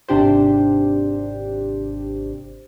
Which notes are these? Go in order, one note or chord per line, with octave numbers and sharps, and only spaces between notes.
G#1 C3 D4 G4 C5